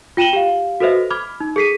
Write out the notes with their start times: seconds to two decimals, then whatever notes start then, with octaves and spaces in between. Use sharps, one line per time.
0.17 F4 G5 D#7 E7 F#7 G7
0.33 G4 F5
0.80 F#4 A4 B4 C5 D#5 E5
1.10 B5 D6 F6 G#6
1.40 D#4
1.56 G#4 A4 B6 C7 D#7